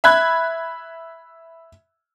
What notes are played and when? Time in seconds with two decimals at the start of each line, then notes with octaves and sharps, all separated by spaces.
0.04 E5 B5 F#6 G#6